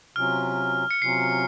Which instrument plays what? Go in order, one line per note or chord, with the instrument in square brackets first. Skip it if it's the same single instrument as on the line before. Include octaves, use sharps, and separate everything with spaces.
[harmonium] C3 F#3 C#4 F4 [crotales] F6
[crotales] C#7
[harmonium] C3 F#3 C#4 F4 [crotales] C7